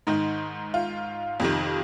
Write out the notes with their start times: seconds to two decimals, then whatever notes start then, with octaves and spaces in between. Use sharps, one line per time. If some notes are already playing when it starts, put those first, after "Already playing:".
0.07 G#2 D#3 D#4
0.74 F4
1.40 F2 C3 D#3